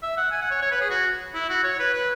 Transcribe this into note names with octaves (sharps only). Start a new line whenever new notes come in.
E5
F#5
G#5
F#5
C#5
C#5
B4
G#4
F#4
E4
F#4
C#5
B4
B4